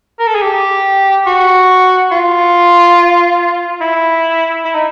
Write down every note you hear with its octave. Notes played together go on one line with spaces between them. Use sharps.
A#4
A4
G#4
G4
F#4
F4
E4
E4
D#4